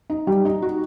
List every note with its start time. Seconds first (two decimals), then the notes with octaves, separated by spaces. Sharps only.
0.10 D#4
0.27 G3
0.45 D#4
0.62 F#4